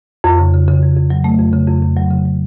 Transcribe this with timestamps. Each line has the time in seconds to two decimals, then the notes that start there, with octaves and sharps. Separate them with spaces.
0.24 F2
0.38 C#3
0.53 C#3
0.68 C#3
0.82 F2
0.96 F2
1.10 F#3
1.24 A3
1.39 F2
1.53 C#3
1.67 F2
1.82 F2
1.96 F#3
2.11 C#3
2.25 F#3